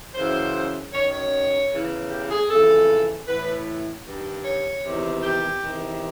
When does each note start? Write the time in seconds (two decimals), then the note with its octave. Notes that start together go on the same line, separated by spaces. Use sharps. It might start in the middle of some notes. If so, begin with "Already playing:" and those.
0.15 F#2 C#3 E3 C5
0.93 F#2 D#3 C#5
1.13 C#5
1.72 E2 C#3 E3
2.10 G4
2.30 G#4
2.50 F2 C#3 E3 A4
3.27 A2 E3 B4
4.06 G2 D#3
4.45 C#5
4.84 E2 C3 D#3
5.22 G4
5.62 E2 C3 D#3